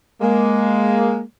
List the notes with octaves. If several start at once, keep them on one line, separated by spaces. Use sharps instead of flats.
G#3 A#3